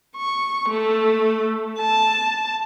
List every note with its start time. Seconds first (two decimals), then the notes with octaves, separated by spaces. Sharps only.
0.17 C#6
0.69 A3
1.79 A5